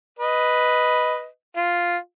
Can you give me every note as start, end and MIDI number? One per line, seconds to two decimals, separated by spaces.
0.19 1.26 71
0.19 1.26 75
1.57 1.97 65